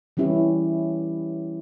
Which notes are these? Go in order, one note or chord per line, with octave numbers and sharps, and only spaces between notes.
E3 G3 C#4 E4 G4